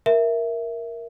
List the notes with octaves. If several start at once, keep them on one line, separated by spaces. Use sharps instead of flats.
A#4 E5